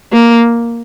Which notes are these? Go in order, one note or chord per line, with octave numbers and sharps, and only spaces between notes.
A#3